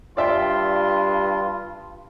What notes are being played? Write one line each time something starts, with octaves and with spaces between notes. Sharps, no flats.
G2 F4 D5 E5 G5 C6